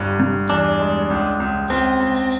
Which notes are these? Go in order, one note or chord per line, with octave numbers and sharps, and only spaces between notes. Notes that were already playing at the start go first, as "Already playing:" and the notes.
Already playing: G1 G2
G2
E2 D4
G#3
C#2
C#2
C#2 C4
C#2